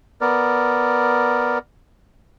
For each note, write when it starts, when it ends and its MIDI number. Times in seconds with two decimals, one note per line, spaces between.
0.21 1.58 59
0.21 1.58 70
0.21 1.58 74